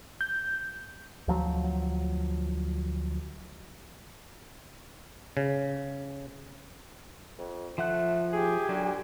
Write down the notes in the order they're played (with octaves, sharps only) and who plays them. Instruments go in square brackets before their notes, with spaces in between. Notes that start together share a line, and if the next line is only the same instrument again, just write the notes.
[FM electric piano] G6
[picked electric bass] D2 F3 F#3
[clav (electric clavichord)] C#3
[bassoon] F2
[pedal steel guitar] F3 F#5 F#6 [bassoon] A3
[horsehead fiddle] G4 G#5 [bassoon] G#4
[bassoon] D3 [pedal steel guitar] F#3